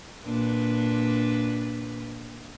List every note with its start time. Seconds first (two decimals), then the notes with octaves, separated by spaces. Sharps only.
0.22 A#2 D4 B4